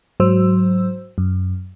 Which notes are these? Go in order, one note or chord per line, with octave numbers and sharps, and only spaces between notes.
G#2 F#3 C5 E6
F#2